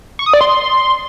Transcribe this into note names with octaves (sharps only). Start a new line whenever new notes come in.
C#6
D#6
D5
C6